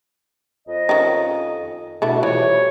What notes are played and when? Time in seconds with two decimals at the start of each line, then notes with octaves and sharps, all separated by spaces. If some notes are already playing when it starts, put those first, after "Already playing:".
0.67 F2 D#5
0.89 D#3 C#4 D#4
2.02 B2 D3 A3 E4
2.23 E3 F3 G3 C#5